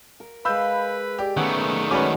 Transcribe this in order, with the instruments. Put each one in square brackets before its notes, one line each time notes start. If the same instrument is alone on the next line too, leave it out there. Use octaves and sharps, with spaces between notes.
[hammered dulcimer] A#4
[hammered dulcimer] G#3 F5 [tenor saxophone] B4 [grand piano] B5 E6 G6
[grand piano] G4 [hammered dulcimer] D5
[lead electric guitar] D#3 A3 [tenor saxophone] B3 [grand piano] C#4 F#5
[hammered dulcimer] F#3 G#3 [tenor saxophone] C#4 [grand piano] B4 D5 D6